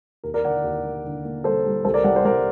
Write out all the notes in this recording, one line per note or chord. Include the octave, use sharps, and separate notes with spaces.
D#2 A#4
A#4 D5
D3 D5 F#5
D#2
A#3
D3
A#3
G3 A4 C5
G3
C2 A4 C5
A#4 D5
C2 D5 F#5
C5
C2 A#4 D5